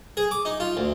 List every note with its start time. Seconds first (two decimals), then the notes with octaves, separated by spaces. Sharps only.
0.17 G#4
0.31 D6
0.45 D#4
0.60 F4
0.77 D2